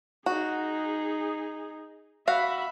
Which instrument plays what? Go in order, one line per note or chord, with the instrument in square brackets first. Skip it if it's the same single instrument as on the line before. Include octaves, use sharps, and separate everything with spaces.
[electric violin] D#4 G#4 [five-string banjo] F#4
[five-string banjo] F#4 F5 [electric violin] E5 B5